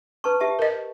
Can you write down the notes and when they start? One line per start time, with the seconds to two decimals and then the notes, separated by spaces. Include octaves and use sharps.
0.24 B4 A5 C#6
0.40 G4 E5 A5
0.59 A#4 D#5